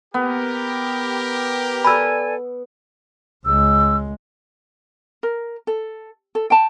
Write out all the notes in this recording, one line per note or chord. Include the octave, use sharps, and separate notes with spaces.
B3 G4 A#4
A4 D5 G#5 B5 E6
C#2 G#3 E6
A#4
A4
A4
G5 A5